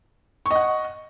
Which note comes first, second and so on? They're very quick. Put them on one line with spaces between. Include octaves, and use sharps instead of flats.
C#6 D#5 F#5